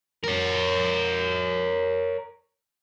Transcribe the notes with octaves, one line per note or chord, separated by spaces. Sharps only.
A#4 C#5